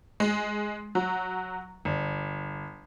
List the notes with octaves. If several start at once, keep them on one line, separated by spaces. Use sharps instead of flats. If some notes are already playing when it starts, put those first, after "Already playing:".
G#3
F#3
G1